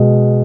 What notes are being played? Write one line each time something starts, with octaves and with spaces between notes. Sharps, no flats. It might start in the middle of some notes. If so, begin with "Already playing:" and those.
Already playing: B2 G#3